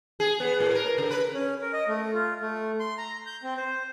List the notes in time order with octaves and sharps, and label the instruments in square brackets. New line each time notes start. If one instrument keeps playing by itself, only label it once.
[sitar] G#4
B3
A2
A#4
C#3
B4
[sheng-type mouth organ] C#4
A#4
D#5
A3
F4
A3
C6
A#5
G6
C4
C5